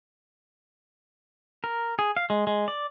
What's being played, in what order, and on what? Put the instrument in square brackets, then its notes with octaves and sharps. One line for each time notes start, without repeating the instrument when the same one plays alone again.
[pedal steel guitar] A#4
G#4
F5
G#3
G#3
D5